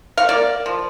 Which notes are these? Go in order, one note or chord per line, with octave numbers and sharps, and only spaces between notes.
F5
A#3 D5
F3